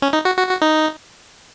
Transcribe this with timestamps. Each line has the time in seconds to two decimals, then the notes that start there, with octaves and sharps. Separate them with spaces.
0.02 C#4
0.13 D#4
0.25 F#4
0.38 F#4
0.49 F#4
0.62 D#4